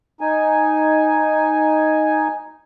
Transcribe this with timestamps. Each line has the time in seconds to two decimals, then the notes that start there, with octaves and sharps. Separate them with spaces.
0.21 D#4 G#5